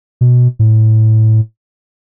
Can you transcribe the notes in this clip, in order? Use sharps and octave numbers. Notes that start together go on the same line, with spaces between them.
B2
A2